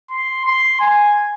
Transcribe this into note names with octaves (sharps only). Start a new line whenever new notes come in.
C6
C6
G#5